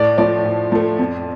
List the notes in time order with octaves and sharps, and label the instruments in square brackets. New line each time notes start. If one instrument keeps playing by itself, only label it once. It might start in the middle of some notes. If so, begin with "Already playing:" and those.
Already playing: [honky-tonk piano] A2 [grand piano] D5
[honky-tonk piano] F3 A3 [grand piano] D5
[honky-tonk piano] A2
F3 A3
F2